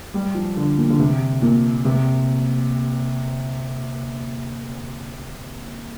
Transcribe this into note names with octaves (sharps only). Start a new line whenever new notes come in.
G3
F3
D3
A#2
D3
C3
A#2
C3